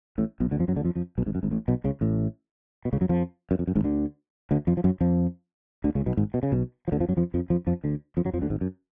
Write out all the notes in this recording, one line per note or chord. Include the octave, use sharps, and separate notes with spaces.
A1 A2
B1 B2
D2 D3
F2 F3
F#2 F#3
D2 D3
F2 F3
F2 F3
B1 B2
G#1 G#2
F#2
G#1 G#2
A1 A2
B1 B2
C#2 C#3
A1 A2
B2
C#2 C#3
F#2 F#3
F2 F3
F#2
F2
F#2
G#1 G#2
D2 D3
D2 D3
F2 F3
F3
F#2 F#3
F2 F3
D2 D3
C#2 C#3
B1 B2
G#1 G#2
B2
C#3
B1 B2
F3
D2 D3
F2 F3
F#2 F#3
F2 F3
F2 F3
F2 F3
F2 F3
D2 D3
F2 F3
F#2 F#3
F2 F3
D2 D3
G#1 G#2
F#2